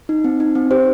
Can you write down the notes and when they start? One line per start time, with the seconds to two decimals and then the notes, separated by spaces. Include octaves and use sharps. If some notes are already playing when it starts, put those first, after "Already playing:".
0.09 D#4
0.24 C4
0.40 D#4
0.55 C4
0.71 G4 C5